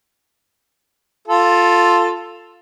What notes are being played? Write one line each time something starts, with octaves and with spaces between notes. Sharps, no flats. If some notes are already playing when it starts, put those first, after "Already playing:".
F4 A4